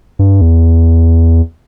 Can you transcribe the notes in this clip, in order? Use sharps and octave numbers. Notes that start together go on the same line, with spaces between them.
G2
E2